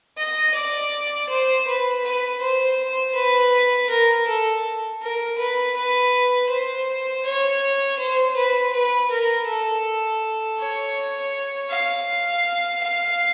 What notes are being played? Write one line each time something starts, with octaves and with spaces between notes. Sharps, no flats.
D#5
D5
C5
B4
B4
C5
B4
A#4
A4
A#4
B4
B4
C5
C#5
C5
B4
B4
A#4
A4
C#5
F5
F5